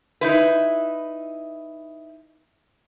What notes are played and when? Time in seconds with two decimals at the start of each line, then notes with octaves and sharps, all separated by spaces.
0.21 D#4 E4 B4